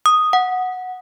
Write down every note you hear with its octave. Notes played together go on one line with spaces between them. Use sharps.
D#6
F#5